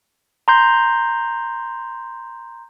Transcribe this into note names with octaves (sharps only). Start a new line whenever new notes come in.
A#5 C6 G6